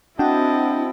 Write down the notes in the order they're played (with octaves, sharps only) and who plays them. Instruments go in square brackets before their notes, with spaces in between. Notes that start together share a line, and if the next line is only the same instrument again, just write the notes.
[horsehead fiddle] C4 E4 [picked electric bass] D4 [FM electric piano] F#4 F#5 G5 [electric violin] D#5 A5